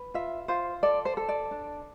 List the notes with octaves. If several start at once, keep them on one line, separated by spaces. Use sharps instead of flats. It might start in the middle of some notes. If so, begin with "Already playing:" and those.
Already playing: B4
F4 E5
F4 C5
A4 D5
C5
A4
D5
D4